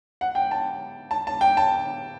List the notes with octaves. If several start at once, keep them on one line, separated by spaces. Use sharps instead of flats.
F#5
G5
A5
A5
A5
G5
A5